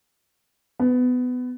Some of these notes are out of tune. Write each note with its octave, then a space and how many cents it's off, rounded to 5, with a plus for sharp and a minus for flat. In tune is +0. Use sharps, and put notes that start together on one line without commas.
B3 +20